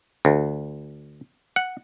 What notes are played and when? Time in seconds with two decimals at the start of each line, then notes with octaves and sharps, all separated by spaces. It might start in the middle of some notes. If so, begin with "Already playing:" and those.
0.25 D2
1.56 F#5